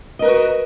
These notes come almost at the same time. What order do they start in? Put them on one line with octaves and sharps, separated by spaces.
D#5 A#4 B4 F#4